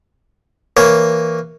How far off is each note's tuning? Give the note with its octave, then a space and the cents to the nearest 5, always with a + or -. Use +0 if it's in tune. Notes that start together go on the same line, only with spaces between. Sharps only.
E3 +0 A#3 +0 C#5 +0